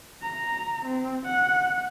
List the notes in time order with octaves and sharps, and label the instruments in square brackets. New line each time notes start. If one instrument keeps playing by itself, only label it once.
[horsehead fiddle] A#5
C4
F#5